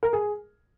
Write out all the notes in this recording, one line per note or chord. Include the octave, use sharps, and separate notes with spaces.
A#4
G#4